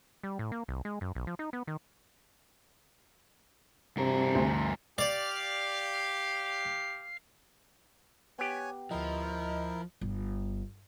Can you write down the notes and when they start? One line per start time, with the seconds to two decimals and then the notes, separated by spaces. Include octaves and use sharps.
0.23 G3
0.39 A2
0.52 A#3
0.68 C2
0.85 G#3
1.01 F#2
1.15 B1
1.27 F3
1.39 D#4
1.53 B3
1.67 D#3
3.97 G2 C3 A#4
4.35 D2
4.98 G4 D5 F5
8.39 B3 G4 C#5 G#5
8.91 D2 F3 E4 A#4 D#5
10.01 G1